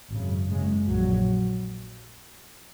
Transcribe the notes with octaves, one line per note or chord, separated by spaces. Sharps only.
G#1 F#2 C#3
F#1 F#2 C#3 G#3
A#1 A#2 F#3